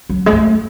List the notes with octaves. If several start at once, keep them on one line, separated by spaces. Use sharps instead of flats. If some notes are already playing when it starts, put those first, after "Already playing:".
F#3
G#3
A3